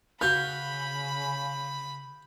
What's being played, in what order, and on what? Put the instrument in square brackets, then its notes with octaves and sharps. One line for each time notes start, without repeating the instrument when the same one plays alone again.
[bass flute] C#3 [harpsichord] F#4 B4 F5 [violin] B5 [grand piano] G6